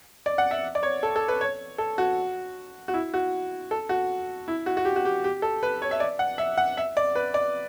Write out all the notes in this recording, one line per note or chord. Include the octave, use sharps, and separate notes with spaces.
D5
F#5
E5
D5
C#5
A4
A4
B4
C#5
A4
F#4
F#4
E4
F#4
A4
F#4
E4
F#4
F#4
G4
F#4
G4
G4
A4
B4
C#5
E5
D5
F#5
E5
F#5
E5
D5
B4
D5